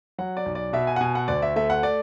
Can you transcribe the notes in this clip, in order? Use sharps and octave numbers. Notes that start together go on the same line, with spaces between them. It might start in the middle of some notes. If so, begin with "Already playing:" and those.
F#3 F#5
D5
B1
D5
B2 E5
G#5
F#5
B2 G#5
F#5
D2 D5
E5
A3 E5
F#5
D5